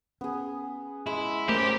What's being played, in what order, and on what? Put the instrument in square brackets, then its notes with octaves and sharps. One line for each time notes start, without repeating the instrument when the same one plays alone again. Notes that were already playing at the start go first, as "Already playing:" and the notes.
[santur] B3 G#4 [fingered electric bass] C#4
[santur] G#3 [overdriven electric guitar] E4
[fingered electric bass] A3 [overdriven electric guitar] C#4 C5 [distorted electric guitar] G4 [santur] A#4